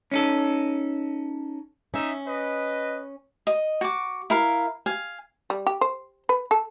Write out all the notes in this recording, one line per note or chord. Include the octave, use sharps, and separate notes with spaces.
C#4 D#4 A4
C#4 D#4 E5
B4 D#5
D#5
F#4 D6
E4 A#4 F5
F5 G#5
G3
G4
C5
B4
A4